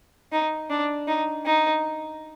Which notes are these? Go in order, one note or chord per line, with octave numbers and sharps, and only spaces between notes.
D#4
D4
D#4
D#4